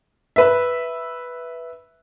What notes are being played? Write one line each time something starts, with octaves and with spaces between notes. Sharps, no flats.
B4 E5